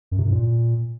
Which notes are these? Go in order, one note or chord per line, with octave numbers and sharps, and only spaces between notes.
F#2
C3
F#2
A#2